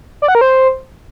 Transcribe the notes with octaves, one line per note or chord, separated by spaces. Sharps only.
D5
F#5
A#4
C5